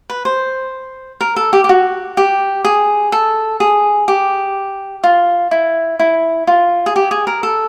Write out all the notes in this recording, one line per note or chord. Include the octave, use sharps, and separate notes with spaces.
B4
C5
A#4
A4
G4
G4
F#4
G4
G#4
A4
G#4
G4
F4
E4
E4
F4
G#4
G4
G#4
A#4
A4